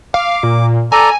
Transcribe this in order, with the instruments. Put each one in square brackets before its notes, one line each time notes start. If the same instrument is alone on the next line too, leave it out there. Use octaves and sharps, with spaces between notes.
[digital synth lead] F5 [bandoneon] D6
[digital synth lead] A#2
[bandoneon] A4 D5 A#5 [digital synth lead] G#5